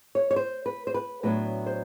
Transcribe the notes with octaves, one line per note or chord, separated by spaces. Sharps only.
C#5
C#5
C5
B4
C5
B4
A2 F#3 B3 D4 B4
C5